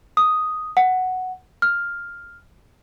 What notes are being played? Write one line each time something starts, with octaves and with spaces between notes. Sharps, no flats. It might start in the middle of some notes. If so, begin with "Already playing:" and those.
D#6
F#5
F6